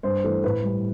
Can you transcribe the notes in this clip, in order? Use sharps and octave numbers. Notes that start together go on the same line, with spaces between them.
G2 C5
E3 A3
A2 B4
G3